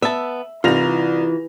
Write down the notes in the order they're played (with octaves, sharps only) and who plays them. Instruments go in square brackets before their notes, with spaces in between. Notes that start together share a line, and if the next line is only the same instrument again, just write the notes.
[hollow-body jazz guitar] B3 A5 [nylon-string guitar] E5
[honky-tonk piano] C2 A#6 F7 [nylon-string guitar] E3 [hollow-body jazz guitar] D#4 F4